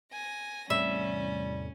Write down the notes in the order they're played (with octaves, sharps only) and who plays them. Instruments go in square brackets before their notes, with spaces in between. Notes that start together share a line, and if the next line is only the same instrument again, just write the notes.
[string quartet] G#5 A#6
[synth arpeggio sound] E2 A2 C3 [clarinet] G3 [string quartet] C#4 [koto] E5